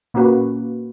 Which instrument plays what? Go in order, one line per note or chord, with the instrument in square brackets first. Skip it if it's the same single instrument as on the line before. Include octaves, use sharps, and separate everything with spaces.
[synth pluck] A#2 A#3 C#4 F#4 B4